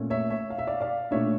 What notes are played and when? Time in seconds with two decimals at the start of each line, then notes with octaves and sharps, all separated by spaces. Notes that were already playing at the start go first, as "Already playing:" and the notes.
Already playing: A#2 A3 C#4
0.10 C#5 E5
0.30 C#5 E5
0.50 F5
0.59 E5
0.67 D5 F5
0.80 D5 F5
1.11 A#2 A3 D4 C#5 E5